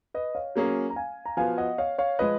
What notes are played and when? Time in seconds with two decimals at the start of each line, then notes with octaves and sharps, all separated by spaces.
0.14 B4 D#5
0.35 C#5 F5
0.55 F#3 A#3 C#4 G#4
0.90 A#5
0.96 F5 G#5
1.26 A#5
1.37 F3 B3 F#4 F5 G#5
1.58 D#5 F#5
1.78 C#5 F5
1.98 C#5 F5
2.19 F3 G#3 B4 D#5